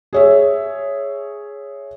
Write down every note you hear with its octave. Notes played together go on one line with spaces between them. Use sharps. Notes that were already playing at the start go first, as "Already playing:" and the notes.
G#4 C#5 E5